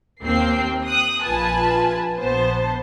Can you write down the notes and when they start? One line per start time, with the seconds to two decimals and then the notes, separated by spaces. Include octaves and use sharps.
0.23 D#2 A#3 C4 G5 C7
0.87 D#6 F#6
1.22 A#1 F4 B4 G#5 A5
2.18 A#1 B3 C5 A5